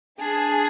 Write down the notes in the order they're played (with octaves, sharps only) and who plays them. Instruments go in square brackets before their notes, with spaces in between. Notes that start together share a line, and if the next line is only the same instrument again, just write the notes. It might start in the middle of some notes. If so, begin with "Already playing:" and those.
[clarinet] D4 [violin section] G#4